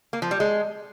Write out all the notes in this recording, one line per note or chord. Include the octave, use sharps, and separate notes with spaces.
A#3
F3
G3
G#3